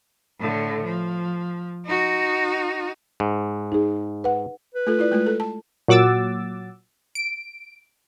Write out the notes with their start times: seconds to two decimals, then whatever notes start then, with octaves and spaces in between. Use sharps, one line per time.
0.40 A2 D3
0.83 F3
1.86 D#4 F#4
3.20 G#2
3.72 D#4 G#4
4.24 B4 F#5
4.74 B4
4.87 A3 F4 A4
4.99 E4 F4 D5
5.12 G#3 A3 F4
5.26 A4
5.40 A5
5.88 A#2 F#3 F#5 D6 E6 A6
7.15 D7